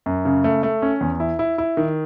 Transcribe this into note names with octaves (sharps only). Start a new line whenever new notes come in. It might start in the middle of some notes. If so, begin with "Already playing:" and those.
F#2
C#3
A3
A3
C#4
E2
E4
E4
E4
D#3